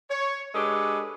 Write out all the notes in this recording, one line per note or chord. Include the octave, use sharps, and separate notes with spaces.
C#5
G#3 D4 G4 A4 B4 C#5